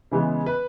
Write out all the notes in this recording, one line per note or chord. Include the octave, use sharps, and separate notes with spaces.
C#3 E3 G#3 B3
B4